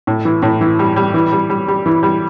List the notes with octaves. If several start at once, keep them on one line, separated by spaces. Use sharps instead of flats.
A2
E3
A2
E3
G3
G3
E3
G3
G3
G3
E3
G3